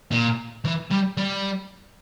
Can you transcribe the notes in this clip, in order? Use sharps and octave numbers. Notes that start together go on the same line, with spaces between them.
A#2
E3
G3
G3